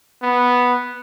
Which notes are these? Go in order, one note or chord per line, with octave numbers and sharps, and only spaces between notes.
B3